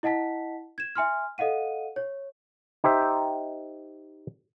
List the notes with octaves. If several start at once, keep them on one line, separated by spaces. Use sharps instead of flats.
E4 D#5 F#5 A5 B6
G#6 E7
E5 G#5 C6 F6
A4 D#5 F5 F#5 D#7
C#5
D#4 G4 C5 E5